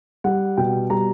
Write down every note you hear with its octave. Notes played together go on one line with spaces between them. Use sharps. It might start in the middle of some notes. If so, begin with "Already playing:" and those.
G3 F#5
B2 G5
G3 A#5